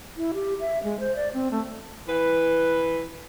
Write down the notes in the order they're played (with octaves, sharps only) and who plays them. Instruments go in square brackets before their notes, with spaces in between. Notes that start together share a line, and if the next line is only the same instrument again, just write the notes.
[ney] E4
G4
E5
G#3
C5
D5
C4
A3
[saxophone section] E3 B4